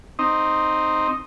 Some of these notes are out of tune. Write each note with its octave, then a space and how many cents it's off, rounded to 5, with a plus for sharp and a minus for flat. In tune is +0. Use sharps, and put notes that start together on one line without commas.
C4 +0 D#4 +0